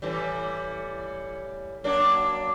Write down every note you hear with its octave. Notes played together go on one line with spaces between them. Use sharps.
A2 E3 G3
F#3 A#3 D4